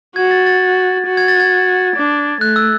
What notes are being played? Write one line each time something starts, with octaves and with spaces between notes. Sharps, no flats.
F#4 G#6
A6
A6
F#4
G#6
A6
G#6
D4
A3 F#6
E6